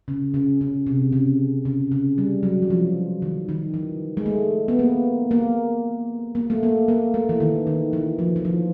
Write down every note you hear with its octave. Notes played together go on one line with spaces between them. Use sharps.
C#3
C#3
C#3
C3
C#3
C#3
C#3
G3
F#3
E3
F3
D#3
D#3
E3
G#3
A3
B3
A#3
A#3
A#3
A3
A#3
A#3
A3
E3
D#3
D#3
E3
F3
E3
F3